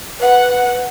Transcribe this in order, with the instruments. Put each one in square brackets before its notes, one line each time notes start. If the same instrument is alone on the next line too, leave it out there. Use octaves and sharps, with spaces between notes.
[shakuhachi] B4 [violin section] F#5